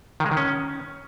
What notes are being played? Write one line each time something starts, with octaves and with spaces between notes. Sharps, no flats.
D#3
G#3
D#3
C#4